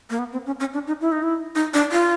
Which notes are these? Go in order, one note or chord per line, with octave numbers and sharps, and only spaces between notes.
A#3
B3
C4
C#4
C#4
D4
D#4
E4
D#4
E4
D#4
D4
F4